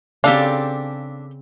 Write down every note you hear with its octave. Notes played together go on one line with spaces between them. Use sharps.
C#3 C4 D4 G4 A4 F5